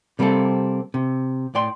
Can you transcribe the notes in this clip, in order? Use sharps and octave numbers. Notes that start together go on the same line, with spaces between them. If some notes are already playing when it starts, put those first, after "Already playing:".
C3 G3 A#3 C4 A4
C3
A2 D5 G5 C6